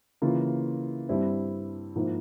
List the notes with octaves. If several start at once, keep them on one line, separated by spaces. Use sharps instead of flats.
C#3 E3 A#3 F4
G2 G3 C4 E4
G#2 F3 A#3 E4